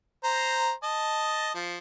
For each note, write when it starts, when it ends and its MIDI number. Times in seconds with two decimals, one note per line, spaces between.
0.24 0.72 72
0.24 0.72 82
0.83 1.54 75
0.83 1.54 81
1.55 1.78 53